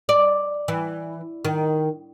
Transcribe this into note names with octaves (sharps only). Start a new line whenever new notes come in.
D5
E3
D#3